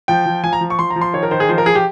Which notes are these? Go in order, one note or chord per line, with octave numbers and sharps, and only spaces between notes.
F3 G5
F3
F3 G#5
A#5
F3
C#6
F3 C6
A#5
F3
C6
D#3 C#5
A#4
D#3 C5
G#4
F3 C5
A#4
F3 G#4
G4